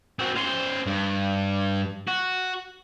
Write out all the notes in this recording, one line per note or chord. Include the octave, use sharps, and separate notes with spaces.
C4 F#4
C#4 C5
G2
F#4